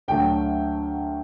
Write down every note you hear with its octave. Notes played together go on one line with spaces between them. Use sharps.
D2 D3 F#3 A3 G5